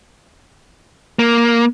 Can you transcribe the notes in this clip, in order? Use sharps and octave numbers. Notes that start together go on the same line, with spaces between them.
A#3